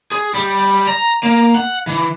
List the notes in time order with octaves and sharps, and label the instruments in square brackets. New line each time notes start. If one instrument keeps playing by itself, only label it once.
[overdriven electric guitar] G#4
G3
A#5
A#3
F#5
E3